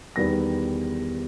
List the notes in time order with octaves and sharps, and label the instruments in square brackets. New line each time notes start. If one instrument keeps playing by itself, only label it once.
[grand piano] E2 D#3 G3 B3 A#6